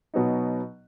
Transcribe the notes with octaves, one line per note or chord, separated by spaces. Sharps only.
B2 F#3 B3 D#4